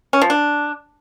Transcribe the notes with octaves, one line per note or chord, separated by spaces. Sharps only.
C#4
F3
D4